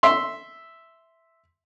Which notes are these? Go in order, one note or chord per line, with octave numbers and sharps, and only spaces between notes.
E5 C6